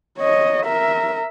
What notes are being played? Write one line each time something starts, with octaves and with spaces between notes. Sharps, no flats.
C#5 D#5
A#4 E5